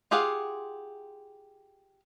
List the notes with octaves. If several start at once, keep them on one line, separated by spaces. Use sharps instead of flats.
F4 G4 G#4 F5 F#5